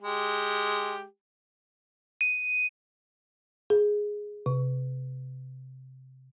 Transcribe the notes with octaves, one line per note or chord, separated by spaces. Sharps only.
G#3 G4
D#7
G#4
C3